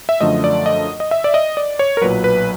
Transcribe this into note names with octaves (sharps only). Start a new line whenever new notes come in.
E5
F#2 D3 F3 A3 D#5
D5
D#5
D#5
E5
D5
D#5
D5
C#5
A#4
B1 A#2 F#3 B4
B4